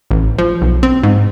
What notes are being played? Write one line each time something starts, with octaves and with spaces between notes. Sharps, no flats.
A1
F3
B1
C4
G#2